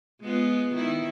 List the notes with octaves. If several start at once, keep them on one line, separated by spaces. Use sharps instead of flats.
G#3 B3 F4
D#3 E4